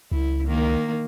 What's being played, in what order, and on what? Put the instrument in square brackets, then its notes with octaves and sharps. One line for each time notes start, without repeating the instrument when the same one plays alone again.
[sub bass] C#2 [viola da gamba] E4
[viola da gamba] D#3 A#3